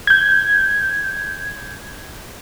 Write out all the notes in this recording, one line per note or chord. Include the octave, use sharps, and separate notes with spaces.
G6 G#6